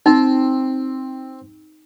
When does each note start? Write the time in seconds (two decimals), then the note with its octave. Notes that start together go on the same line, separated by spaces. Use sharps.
0.06 C4 D#4